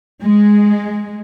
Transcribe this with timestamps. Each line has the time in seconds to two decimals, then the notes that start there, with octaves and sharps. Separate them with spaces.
0.22 G#3